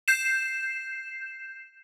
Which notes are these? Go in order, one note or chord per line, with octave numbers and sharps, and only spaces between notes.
G6 C7 E7